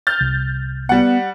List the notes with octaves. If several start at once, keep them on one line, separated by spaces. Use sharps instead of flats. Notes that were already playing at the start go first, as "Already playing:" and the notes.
F6 G6 A6
C2
G3 B3 F#5